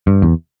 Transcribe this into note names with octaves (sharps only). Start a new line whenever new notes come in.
G2
E2